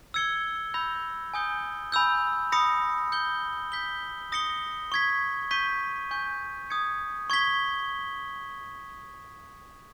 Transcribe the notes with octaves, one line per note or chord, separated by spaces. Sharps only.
E6 G#6 C#7 G7
B5 E6 G6 A#6
G#5 D#6 G6 C#7 G7
G#5 B5 E6 G6
B5 D#6 A#6 C#7
G6 C#7 G7
G6 B6 G7
D#6 A#6 C#7 G7
C#6 G#6 B6
C#6 G6 B6 D#7
G#5 C#6 G6
D#6 G#6 C#7
C#6 G#6 B6 G7